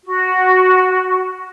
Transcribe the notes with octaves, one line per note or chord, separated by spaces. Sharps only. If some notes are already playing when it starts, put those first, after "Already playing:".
F#4